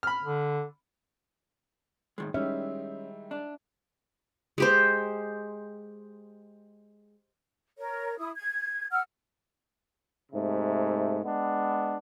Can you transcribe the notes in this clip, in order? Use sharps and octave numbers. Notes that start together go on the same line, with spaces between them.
B5 F6
D3
A2 D#3 G#3
D#3 G3 G#3 C#4 E5
D4
G#3 G4 C5
A#4 C#5
E4 D#6
G#6
F#5 E6 F6
G#2 C3 A3
G#3 B3 D4